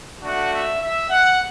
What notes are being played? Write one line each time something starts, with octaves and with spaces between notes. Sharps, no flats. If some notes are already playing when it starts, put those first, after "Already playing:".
A3 D4 F#4 F#5
E5
E5
F#5